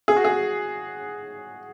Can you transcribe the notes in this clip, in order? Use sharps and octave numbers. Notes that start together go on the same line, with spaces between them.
G#4
F#4
G#4